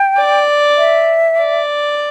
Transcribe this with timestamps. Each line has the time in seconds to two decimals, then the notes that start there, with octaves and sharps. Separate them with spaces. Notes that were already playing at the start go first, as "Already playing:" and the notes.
Already playing: G5
0.18 D5
0.77 E5
1.38 D5